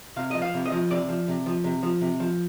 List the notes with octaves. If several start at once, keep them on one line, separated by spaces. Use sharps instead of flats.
C3 F5
F3 D#5
F5
C3
D#5
F3
C3 D5
F3
C3
F3
C3
F3
C3
F3